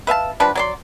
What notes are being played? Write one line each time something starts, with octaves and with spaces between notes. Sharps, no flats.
B4 E5 F5 A5
F3 G3 D4 B4
F#3 D5 C6